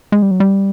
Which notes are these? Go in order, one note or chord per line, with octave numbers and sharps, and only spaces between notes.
G#3
G3
F#3
G3